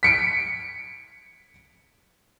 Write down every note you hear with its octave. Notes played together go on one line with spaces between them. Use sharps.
B6 C#7 D7